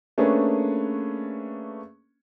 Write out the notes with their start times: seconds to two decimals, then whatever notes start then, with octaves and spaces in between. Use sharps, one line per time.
0.18 A3 A#3 C#4 D4 G#4 B4